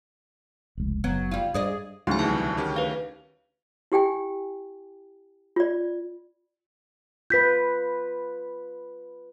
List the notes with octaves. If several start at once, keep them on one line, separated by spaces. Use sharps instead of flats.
F1 C#2
F#1 F#3 B3
G3 F4
G2 G#4 D5 D#5
D2 C#3 F#3 D#4 F5 G#5 C6
C2 E3 G3 A5
D#3 C#4 G4
B4 F5
E4 G4 G5 G#5
F4 D5
F4 B4 G6 B6